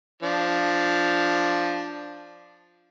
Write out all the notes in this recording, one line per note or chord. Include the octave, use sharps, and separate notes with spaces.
F3 D4